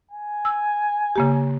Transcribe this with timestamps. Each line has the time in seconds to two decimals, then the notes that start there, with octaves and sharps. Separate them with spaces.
0.11 G#5
0.45 E6
1.16 C#3 A#3 G4